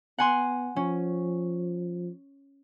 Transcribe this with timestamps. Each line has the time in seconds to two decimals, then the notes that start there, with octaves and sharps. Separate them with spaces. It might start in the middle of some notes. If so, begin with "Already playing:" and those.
0.18 B3 F#5 G#5 C6
0.76 F3 C#4